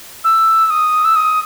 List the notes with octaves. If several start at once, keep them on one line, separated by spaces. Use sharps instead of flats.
E6
D#6
E6
D#6